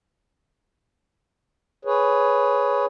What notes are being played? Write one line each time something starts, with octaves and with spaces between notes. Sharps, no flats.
G#4 B4 C#5